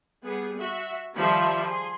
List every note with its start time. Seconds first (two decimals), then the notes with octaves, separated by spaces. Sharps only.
0.23 G3 B3 G#4
0.57 F#4 E5
1.15 D#3 F3 G3 E5 B5 C6
1.64 G#4 C6